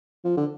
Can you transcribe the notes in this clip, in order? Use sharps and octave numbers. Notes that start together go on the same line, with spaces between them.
F3
D3